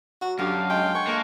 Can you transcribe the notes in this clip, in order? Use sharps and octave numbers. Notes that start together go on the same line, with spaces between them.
F#3 F#4
F#2 D3 G4 F5
G#3 G5
C#5 F#5 G#5 C#6
A#3 A4 E5 F5